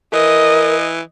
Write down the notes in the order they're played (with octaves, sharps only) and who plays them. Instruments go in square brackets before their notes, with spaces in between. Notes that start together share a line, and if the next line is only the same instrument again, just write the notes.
[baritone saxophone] E3 [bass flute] A#4 [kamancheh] D#5